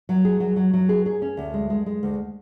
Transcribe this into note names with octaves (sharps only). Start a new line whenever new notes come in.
F#3
G#4
F#3
F#3
F#3
G#4
G#4
C#4
D2
G#3
G#3
G#3
D2